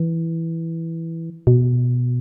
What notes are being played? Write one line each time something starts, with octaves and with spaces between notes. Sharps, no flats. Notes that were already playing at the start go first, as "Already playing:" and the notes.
Already playing: E3
B2